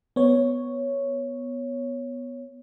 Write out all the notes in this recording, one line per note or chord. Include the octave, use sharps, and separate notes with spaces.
B3 C#5